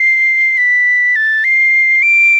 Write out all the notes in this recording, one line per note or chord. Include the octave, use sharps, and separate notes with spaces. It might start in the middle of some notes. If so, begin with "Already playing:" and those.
Already playing: C7
B6
A6
C7
D7